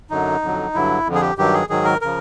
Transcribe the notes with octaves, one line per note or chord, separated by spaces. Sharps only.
F#2 D3 F#3 D#4
F2 D3 F#3
G2 D3 F#3 E4
F2 D3 F3
G#4
G4
G2 D#3 F#3 G4
G#4
G#2 D#3 F#3 G#4
A#4
C#3 F3 A#4